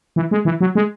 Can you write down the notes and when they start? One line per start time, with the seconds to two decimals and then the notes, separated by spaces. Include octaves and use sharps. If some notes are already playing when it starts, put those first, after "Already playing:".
0.16 E3
0.31 G#3
0.45 E3
0.61 F#3
0.75 G#3